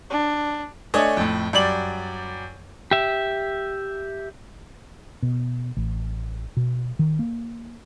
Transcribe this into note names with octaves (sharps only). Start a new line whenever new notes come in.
D4
A3 D4 C#5 D#5 G#5
F2 A2
F#2 G3 D5 F#7
G4 E5
B2
A1
B2
D#3
A#3